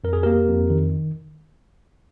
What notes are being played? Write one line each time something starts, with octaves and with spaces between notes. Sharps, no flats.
F2 A#4
G#4
A#3 G4 A#4
F2
D#3